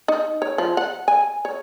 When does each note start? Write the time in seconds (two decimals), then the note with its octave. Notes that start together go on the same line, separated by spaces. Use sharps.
0.08 D#4
0.42 C#5
0.58 F3
0.77 F#5
1.08 G#5
1.45 C#5